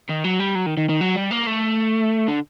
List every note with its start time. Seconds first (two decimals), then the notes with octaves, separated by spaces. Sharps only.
0.09 D#3
0.24 F#3
0.39 G3
0.55 F#3
0.66 D#3
0.77 D#3
0.89 D#3
1.01 F#3
1.16 G3
1.31 A#3
1.47 A3
2.28 D3